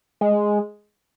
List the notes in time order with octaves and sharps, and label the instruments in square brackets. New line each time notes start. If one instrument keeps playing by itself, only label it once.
[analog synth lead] G#3